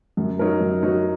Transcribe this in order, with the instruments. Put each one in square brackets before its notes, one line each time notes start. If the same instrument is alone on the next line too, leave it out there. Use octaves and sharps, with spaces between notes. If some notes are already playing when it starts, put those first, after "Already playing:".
[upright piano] F#2
F#3 D#4 F#4 A#4
F#2
F#3 D#4 F#4 A#4